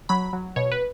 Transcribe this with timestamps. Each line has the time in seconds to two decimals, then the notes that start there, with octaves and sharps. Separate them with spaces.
0.09 F#3 B5
0.33 F#3
0.56 B2 C#5
0.72 B4